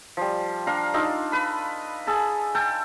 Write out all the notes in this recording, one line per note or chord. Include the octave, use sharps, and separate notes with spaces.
F3 G3
D4 F5 A#5
D4 D#4 F4 A4
B4 B5
G#4 A4 A5
A4 G5 A5